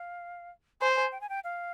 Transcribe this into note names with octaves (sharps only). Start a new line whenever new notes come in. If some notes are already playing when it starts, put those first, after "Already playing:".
Already playing: F5
C5 G#5
G#5
G5
G#5
G5
F5